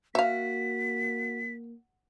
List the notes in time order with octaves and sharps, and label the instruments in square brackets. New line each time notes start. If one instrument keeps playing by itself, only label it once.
[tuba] A#3 [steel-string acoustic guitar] F#4 [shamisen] E5 F5 [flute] B6